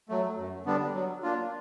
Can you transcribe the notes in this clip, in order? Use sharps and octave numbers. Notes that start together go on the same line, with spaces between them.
F#3 A3
F#2
D3 G3 B3 D4
F#3
A#3 D4 F4